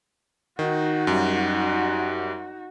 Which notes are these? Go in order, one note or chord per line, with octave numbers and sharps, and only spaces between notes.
D#3 D#4 F#4
F#2 G3